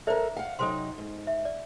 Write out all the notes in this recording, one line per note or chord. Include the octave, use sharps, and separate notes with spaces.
A4 A#4 C5 D5 E5
F5 F#5
C3 F#3 D#4 A4 C5 C6
G#2
E5
D5